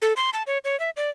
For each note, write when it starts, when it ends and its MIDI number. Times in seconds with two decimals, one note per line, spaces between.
0.02 0.13 69
0.16 0.30 84
0.33 0.43 81
0.47 0.58 73
0.65 0.78 73
0.80 0.90 76
0.97 1.10 74